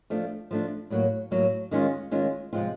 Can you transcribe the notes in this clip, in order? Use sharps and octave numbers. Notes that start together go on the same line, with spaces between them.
F3 A3 D4
F3 A3 D4
A2 F#3 A#3
A2 F#3 A#3
D#3 G#3 C#4 F4
D#3 G#3 C#4 F4
C3 F3 G#3 C4 F4